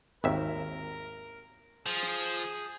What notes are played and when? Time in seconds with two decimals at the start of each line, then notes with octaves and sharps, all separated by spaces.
0.24 G#1 D#2 A#4 E5
1.86 F3 G#4